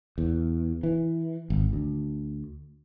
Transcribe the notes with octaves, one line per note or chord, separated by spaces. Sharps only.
E2
E3
G#1
D2